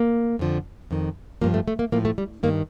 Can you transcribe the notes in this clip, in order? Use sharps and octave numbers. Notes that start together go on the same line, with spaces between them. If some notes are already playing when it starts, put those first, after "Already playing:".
Already playing: A#3
F2 D3 F3
F2 D#3
G2 F3 A#3
A3
A3
A#3
A2 F3 A#3
A3
G3
G2 D#3 A#3